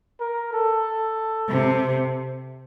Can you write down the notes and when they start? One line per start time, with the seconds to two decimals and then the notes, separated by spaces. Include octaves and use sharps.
0.20 A#4
0.53 A4
1.49 C3